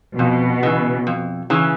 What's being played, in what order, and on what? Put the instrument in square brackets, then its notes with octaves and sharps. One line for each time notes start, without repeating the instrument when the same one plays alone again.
[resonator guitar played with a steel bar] F2 [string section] B2
[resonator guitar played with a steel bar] C#3 E3
F2
C#3 E3